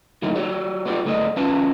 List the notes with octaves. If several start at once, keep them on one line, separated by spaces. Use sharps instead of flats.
A2 D#3 F#3 G#3 A#3 E4
F#4 G4 C#5 D5
B3 F4 G4 D5
D2 G#2 A3 B3 D5 D#5
E2 C#4 F4 B4 F5 A5